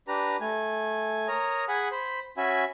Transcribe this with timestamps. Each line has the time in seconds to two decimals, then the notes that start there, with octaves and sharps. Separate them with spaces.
0.08 D4 G4 B4 A#5
0.41 A3 G#5
1.28 A#4 C#5 A#5 D#6
1.68 G#4 F#5 G#5 B5
1.91 C5 B5
2.37 C#4 F#4 E5 G#5 B5